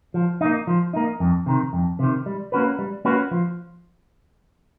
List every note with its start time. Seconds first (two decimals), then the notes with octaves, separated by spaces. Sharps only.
0.14 F3
0.41 A#3 D#4
0.67 F3
0.93 A#3 D#4
1.20 F2
1.46 C3 D#3
1.73 F2
1.99 C3 D#3
2.26 G3
2.52 A#3 C#4 F#4 B4
2.79 G3
3.05 A#3 C#4 F#4 B4
3.31 F3